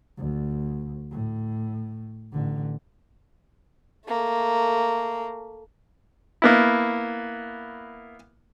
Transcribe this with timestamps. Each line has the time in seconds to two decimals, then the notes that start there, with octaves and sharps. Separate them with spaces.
0.17 D2
1.11 A2
2.32 A1 D3
4.07 A3 A#3
6.42 A#3 B3 E4